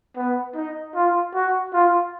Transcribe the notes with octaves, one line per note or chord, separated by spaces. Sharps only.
B3
D#4
F4
F#4
F4